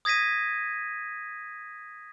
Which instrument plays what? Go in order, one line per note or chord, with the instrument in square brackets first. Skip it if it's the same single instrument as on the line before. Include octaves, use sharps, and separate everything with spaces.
[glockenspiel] D#6 G#6 A#6 B6 D#7